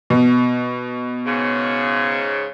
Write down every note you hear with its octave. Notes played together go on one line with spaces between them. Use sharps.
B2
G#2 C#3